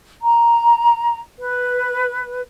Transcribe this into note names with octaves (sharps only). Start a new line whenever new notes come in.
A#5
B4